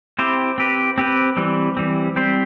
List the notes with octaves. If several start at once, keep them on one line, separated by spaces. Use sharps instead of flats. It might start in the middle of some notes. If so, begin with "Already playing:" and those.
C4 E4 G4 C5
C4 G4 B4
C4 G4 B4
E3 G3 C4
E3 G3 C4
G3 C4 G4 C5